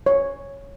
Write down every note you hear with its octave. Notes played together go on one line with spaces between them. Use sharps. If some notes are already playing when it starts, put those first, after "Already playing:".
C#5